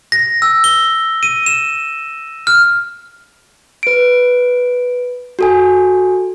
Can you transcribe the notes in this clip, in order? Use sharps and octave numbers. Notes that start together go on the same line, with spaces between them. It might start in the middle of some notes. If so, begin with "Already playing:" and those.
A#6
E6
G7
D#7
E7
F6
B4 D7
F#4 A4 G#5